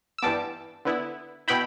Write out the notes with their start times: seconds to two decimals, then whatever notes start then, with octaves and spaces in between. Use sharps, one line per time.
0.18 E6
0.22 G2 E3 G3 B3 A5 D6
0.85 D3 B3 E4
1.48 B2 B3 E4 G5 B5